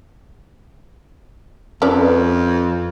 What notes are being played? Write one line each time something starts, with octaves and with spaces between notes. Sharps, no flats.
F2 C#4 B4 D5